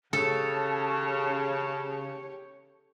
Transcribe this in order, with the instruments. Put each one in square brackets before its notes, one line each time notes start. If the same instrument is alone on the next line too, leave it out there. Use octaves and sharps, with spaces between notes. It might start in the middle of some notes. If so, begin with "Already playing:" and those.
[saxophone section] C#3 [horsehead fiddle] G4 C#5 [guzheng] A4 [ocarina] A5